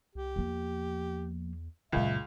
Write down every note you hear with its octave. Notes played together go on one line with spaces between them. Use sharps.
C2 G4
E2 F3 A#3
C#2 F#2 A#2 F#3 E5